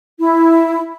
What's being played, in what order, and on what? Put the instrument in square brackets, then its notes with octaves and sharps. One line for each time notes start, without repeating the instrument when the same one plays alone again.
[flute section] E4